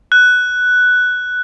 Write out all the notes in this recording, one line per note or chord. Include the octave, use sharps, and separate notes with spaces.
F#6